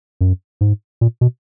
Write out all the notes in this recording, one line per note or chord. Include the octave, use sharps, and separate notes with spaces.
F#2
G#2
A#2
B2